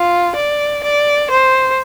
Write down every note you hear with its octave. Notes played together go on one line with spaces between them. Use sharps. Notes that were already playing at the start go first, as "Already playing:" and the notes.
Already playing: F4
D5
D5
C5